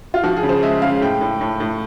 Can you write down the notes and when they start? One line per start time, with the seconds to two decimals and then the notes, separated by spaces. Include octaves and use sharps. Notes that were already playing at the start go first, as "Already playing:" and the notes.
0.14 F4
0.24 F3 F#4
0.37 G#4
0.43 C#3
0.49 C5
0.63 G#3 E5
0.82 C#3 F5
1.01 A2 G5
1.21 A2
1.41 A2
1.60 A2